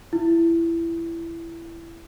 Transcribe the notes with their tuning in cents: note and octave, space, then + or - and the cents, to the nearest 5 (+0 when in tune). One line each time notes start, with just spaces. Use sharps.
E4 +20